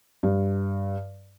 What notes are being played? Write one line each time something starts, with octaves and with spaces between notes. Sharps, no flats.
G2